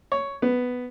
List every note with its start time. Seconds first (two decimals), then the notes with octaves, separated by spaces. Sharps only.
0.12 C#5
0.42 B3